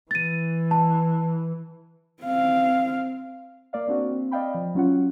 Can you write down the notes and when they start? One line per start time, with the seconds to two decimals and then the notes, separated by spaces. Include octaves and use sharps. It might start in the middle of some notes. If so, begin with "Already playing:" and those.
0.11 E3 A6 D#7
0.71 A5
2.23 C4 F5
3.73 A#3 D5 F5
3.87 A#3 C4 D4 F#4
4.11 C4
4.31 D5 D#5 F5 G5 B5
4.55 F3
4.75 F#3 C#4 F4 F#5